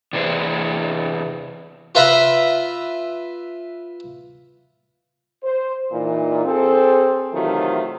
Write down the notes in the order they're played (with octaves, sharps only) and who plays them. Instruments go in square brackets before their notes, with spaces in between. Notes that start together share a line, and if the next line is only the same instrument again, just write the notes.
[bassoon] E2 [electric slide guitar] C3 E3 C5
[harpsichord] F4 B4 E5 A#5 B5
[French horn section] C5
A#2 E3 D#4
C4 G#4 A4
C3 D#3 E3 F#3 A3 F4